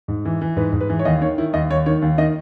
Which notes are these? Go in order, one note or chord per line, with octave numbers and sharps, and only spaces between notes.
G#2
E3
E3
G#2 B4
G#2
B4
E3
C#5
D#2 D#5
D#3 C#5
D#3 E4
D#2 D#5
D#2 C#5
D#3 C#5
D#2
D#3 D#5